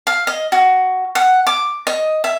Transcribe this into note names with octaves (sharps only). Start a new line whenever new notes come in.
F5
D#5
F#4
F#5
D6
D#5
E5